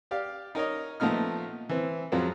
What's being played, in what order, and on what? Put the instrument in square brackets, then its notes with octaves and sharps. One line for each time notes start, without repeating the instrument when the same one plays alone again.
[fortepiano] G4 D5 F5
D#4 A#4 C#5 D#5
A#2 F3 A3 B3 D#4 F6
E3 C4
F2 F3 F#3 G#3 C4